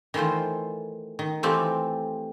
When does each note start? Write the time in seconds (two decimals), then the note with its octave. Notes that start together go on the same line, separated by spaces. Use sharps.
0.14 D#3 E3 A3 F4 C5
1.19 D#3
1.43 E3 A3 C4 F4 G4